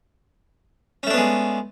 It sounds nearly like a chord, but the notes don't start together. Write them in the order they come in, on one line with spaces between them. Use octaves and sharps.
C#4 A3 D4 B3 G#3